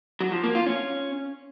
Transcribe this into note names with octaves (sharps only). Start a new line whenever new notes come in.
F#3
F3
A#3
F4
C#4